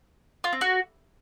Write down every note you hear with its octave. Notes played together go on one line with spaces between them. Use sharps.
F4
C4
F#4